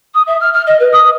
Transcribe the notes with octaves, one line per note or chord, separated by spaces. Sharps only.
D#6
E5
F6
F6
D#5
B4
D#6